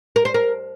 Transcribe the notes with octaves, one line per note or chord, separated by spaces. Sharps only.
A#4
C5
A#4